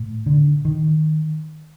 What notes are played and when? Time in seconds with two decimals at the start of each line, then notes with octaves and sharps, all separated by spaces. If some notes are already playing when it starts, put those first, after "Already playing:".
Already playing: A2
0.26 D3
0.65 D#3